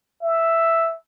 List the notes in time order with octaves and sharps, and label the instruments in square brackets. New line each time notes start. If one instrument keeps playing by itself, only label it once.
[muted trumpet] E5